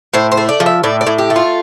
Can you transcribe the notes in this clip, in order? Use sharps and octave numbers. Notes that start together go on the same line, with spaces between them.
A2 C5
C5
A3
D5
F3
E5
A2 D5
D5
A2
G4
A3
F4